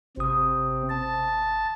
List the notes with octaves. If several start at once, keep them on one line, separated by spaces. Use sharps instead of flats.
G#1 C3 C4 D#6
A5